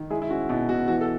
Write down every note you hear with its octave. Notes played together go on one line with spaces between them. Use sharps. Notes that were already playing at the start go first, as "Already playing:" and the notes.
Already playing: D#3
G#3 E4 G#4
E4
C#4 F#4
B2 E4
B2 F#4
E3 F#4
A4